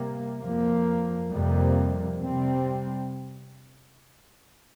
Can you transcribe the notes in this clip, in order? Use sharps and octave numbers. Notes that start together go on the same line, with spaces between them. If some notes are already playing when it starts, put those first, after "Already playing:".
Already playing: C3 G3 A#3
F2 F3 A#3
F2 C3 G3 A#3
C3 G3 C4